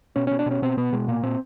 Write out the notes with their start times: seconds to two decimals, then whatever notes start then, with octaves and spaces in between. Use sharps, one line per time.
0.16 B2 C#4
0.27 B2 C#4
0.39 D4
0.46 B2 C#4
0.62 B2 C4
0.77 B2 B3
0.93 B2 G#3
1.08 A#2 A#3
1.23 A#2 C4